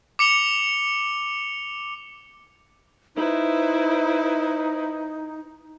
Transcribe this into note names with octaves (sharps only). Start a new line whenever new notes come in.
D6 C#7 F7 G7
D#4 E4 B4 C5